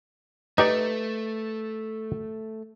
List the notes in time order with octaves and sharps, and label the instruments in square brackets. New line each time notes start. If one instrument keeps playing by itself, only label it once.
[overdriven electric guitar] A3 [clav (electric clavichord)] D#4 G4 D5 [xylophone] B4